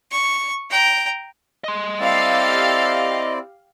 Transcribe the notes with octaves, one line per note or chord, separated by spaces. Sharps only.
C#6
G5 A#5
D#5 C6
C4 E4 G4 A4 D5 F5